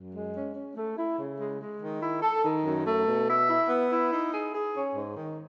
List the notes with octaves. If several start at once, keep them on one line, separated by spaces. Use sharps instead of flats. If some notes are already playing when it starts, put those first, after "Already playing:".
Already playing: F#2
G#3
C#4
C#4
A3
E4
C#3
G#3
G#3
D#3
E4
A4
D#3
F#2
A3
B2
E5
E4
B3
E4
D#4
G#4
G#4
C#4
G#2
D#3